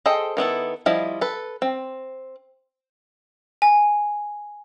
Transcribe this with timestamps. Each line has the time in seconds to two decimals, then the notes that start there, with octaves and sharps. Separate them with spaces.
0.06 G#4 A4 C5 D#5 G5
0.37 D#3 B3 E4 A4
0.86 F3 G3 E4 D#5
1.21 A4 B4
1.62 C4
3.62 G#5